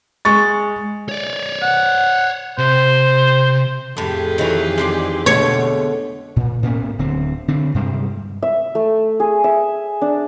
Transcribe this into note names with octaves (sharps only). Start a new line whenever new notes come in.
G#3 C#6 A6
C#5 D5
F#5
C3 C5
F2 A2 A3 G4 G#4
D#3 E3 F#3 A3
G#3 C4 D5
B2 D3 A3 C#5
A#2
A2 A#3 B3 C#4
D1 D3 C4
D3 C4 D4
G2 C3 G3 G#3
E5
A3
G#4
E5
D4